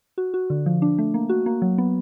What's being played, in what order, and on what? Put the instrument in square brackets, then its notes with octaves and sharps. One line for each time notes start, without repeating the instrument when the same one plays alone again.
[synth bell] F#4
F#4
D3
F3
D4
A3
A#3
F#4
A#3
F#3
B3